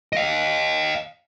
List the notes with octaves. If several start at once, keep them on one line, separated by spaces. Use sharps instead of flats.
D#5 F5